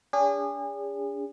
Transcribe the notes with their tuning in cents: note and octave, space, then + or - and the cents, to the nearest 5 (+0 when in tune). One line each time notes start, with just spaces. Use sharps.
D4 -40 G#4 -35